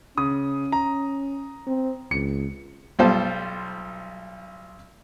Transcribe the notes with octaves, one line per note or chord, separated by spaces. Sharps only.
C#3 C#4 D#6
A#5
C4
C#2 C#7
B1 G3 F4 C5 A5